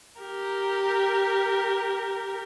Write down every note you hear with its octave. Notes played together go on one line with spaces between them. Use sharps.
G4 A#4